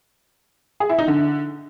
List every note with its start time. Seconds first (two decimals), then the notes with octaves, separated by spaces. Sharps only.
0.80 G#4
0.89 E4
0.99 D#4
1.08 D3